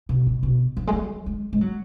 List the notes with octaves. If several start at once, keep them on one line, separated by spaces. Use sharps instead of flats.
B2
B2
B2
F3
G#3
F#3
G#3
G#3
F#3